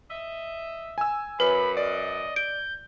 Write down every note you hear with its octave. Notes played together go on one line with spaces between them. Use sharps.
D#5 E5
G#5 E6
F#2 B4 B5
D5 D#5
G6 D7